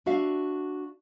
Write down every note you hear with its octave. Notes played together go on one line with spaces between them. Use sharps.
D4 F#4 E5 F5